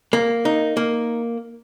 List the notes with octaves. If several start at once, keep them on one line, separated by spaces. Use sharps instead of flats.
A#3
D#4
A#3